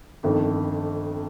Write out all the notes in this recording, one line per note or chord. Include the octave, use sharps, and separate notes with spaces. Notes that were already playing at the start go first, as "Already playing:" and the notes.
G1 F2 D#3